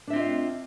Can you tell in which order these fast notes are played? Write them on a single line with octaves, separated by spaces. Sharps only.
D4 E5 C4 F4 D#5